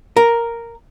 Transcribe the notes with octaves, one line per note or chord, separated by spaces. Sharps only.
A#4